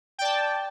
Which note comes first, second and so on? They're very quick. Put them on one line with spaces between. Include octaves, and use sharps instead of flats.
G5 D5 A5